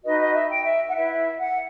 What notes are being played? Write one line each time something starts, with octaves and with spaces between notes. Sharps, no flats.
D#4 F#4 B4 D#5
D#5
E5
G5
E5
F#5
E4 B4 E5
F#5